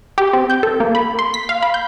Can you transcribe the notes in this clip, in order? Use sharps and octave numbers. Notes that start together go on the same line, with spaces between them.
G4
C4
G6
A4
A#3
B5
C6
B6
F5
B5
G6